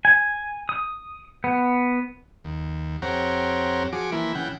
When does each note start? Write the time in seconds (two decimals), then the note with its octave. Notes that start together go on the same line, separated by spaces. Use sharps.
0.05 G#5
0.69 D#6
1.44 B3
2.44 D#2
3.02 F2 C4 G4 C#5 F#5 A#5
3.92 F3 F#4 G#4 D6
4.12 E3 F3 A#3 E4
4.35 C#3 E3 F#5 G5